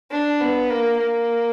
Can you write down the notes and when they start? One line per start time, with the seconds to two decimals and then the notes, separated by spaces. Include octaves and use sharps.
0.12 D4
0.41 B3
0.70 A#3
0.98 A#3